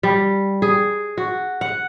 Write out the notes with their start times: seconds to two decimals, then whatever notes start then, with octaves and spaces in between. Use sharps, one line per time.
0.03 G3
0.62 G#4
1.17 F#4
1.61 F#5